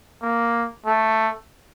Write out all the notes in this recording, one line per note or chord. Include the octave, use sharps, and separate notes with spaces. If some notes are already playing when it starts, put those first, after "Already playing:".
A#3
A3